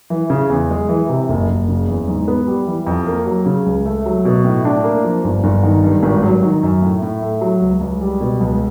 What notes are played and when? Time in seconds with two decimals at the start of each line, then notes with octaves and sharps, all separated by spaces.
0.10 E3
0.30 C#3
0.50 E2
0.70 G#3
0.89 E3
1.09 C3
1.29 F#1
1.48 F#1
1.68 C#3
1.87 E2
2.08 G#2
2.28 B3
2.47 G3
2.67 E3
2.87 F2
3.07 A#3
3.26 F#3
3.46 C#3
3.66 C#2
3.86 A3
4.06 F#3
4.25 B2
4.45 A2
4.65 D4
4.84 A#3
5.04 F3
5.24 G1
5.44 G1
5.63 D#3
5.84 G2
6.03 G#1
6.23 F#3
6.43 D#3
6.63 F#2
6.82 A2
7.02 A2
7.22 A3
7.41 F#3
7.61 C#2
7.81 C#2
8.01 G3
8.20 B2
8.41 C#2